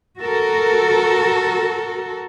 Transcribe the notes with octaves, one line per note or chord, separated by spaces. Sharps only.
F#4 A4 A#4